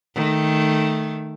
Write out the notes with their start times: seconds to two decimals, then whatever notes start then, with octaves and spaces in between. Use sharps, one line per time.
0.15 D#3 A3